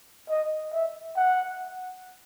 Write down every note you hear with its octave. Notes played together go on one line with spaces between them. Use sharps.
D#5
E5
F#5